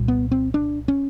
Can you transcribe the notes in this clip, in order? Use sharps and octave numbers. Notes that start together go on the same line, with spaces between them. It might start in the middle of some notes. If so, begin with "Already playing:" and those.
Already playing: C2 A#2
B3
C4
D4
C#4